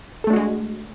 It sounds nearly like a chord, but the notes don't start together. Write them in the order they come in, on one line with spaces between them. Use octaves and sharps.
A4 A3 D4 F#4 G#3